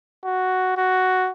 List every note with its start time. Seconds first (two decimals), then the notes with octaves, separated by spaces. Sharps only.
0.25 F#4
0.77 F#4